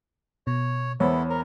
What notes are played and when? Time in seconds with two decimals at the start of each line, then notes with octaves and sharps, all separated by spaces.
0.47 B2 C#5
1.00 E2 B3 E4 A4 C5 C#5
1.30 A#4